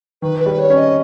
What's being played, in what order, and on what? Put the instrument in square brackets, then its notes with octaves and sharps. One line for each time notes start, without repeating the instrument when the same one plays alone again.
[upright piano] D#3 [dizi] B4
[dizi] B4
[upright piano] G3
[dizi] C#5
[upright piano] C#4
[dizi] D#5